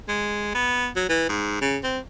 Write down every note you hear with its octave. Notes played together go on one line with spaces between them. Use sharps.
G#3
B3
F#3
E3
G#2
C#3
C4